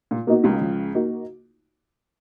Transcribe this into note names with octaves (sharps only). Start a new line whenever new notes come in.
A#2
B2 A#3 D#4 F#4
C#2 C#3
F3
A#3 D#4 F#4